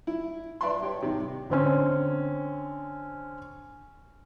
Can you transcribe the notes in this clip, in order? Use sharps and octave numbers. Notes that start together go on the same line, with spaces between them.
E4
B4 D5 E5 A5 B5 C6
G4 C#5
C3 D#3
D3 C4 C#4